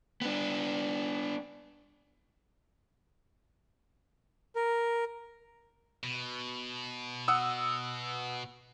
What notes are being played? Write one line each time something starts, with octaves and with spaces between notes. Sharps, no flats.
B3 D4
A#4
B2
F#5 D#6 E6